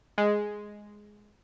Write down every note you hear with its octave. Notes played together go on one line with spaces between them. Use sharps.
G#3